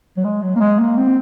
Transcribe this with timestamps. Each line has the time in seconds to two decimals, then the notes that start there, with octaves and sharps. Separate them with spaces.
0.17 F#3
0.24 G#3
0.42 F#3
0.56 A#3
0.60 G#3
0.79 A#3
0.97 C4